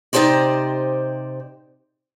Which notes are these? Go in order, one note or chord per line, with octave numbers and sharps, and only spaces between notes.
C3 D#4 E4 G4 C5 D5